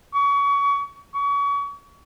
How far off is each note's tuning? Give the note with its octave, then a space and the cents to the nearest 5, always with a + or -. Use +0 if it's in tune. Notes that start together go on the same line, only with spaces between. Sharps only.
C#6 +30
C#6 +35